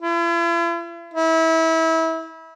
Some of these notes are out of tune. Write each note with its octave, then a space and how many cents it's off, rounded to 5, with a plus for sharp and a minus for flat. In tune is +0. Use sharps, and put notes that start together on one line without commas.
E4 +45
E4 -25